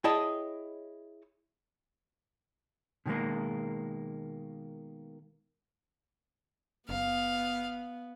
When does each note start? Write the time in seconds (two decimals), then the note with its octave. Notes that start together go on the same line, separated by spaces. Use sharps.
0.04 E4 G#4 C#5 D#5 G5 A5
3.06 B2 D#3 G3 G#3 A#3
6.89 F#1 B3 F5